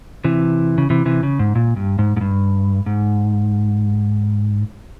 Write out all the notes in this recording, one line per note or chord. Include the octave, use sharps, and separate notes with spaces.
C3 E3
C#3
C3 E3
C3 E3
C#3
G#2
A#2
G2
G#2
G#2
G2
G#2